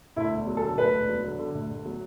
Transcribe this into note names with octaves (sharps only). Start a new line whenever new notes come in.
D2 E4
E1
F#3
A4
D3
D2 B4
E1
F#3
D3
D3
D2
D2
F#3